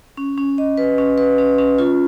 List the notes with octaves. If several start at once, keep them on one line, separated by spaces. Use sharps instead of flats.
C#4
C#4
D#5
B4
C#4
B4
C#4
C#4
F4